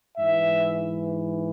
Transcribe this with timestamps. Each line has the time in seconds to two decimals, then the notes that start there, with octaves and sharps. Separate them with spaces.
0.17 G#2 E3 E5